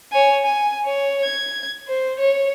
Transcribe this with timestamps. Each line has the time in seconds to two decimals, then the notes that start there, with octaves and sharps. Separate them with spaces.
0.12 C#5 G#5
0.45 G#5
0.85 C#5
1.24 G#6
1.88 C5
2.20 C#5